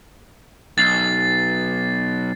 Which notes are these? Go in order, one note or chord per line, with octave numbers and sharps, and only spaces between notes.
B1 A6 C7